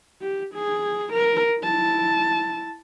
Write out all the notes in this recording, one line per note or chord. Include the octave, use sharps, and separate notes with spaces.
G4
G#4
A#4
E4 A5